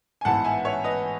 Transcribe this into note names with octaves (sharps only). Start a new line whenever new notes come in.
G#5
A1 G#2 E3 B3 F#5 A5
E5 G#5
C#5 E5
B4 D#5